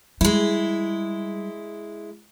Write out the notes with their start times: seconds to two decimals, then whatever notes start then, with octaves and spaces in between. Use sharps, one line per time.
0.21 G3 G#3 E4